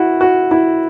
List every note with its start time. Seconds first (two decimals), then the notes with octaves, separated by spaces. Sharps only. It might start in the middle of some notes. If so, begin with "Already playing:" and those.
Already playing: E4 F#4
0.21 F#4
0.51 E4